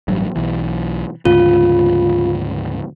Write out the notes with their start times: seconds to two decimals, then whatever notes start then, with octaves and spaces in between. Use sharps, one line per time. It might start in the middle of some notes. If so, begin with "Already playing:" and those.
0.08 A1 G2 F#3
0.36 B1 E3
1.25 D2 G#2 C#3 F4